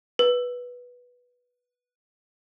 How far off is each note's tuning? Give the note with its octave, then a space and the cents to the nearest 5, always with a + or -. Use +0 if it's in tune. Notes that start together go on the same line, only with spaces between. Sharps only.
B4 -10